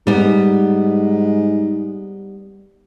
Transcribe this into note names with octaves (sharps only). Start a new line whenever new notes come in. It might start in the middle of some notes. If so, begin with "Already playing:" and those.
G#2 G3 B3